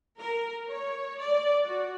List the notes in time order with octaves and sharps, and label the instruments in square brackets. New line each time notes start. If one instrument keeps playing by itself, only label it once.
[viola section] A#4
C#5
D5
F#4